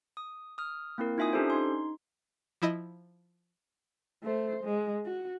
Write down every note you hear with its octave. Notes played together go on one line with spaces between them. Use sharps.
D#6
D#6 F6
A#3 C4 E4 A#4
D#4 F4 E5 G#5 D#6
C#4 D4 G4 A4 C5
D#4 C6
F3 E4 D#5
A3 C5
G#3
F#4